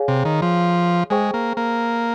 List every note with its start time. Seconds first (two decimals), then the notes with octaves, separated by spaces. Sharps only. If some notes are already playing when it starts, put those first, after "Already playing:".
Already playing: G#4 C#5 F5 G#5
0.08 C3
0.25 D#3
0.42 F3
1.10 G#3 G#4 C5 G5 C#6
1.34 A#3
1.57 A#3